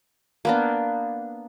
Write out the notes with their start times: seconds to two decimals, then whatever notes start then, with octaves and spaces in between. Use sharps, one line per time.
0.45 A#3 B3 D4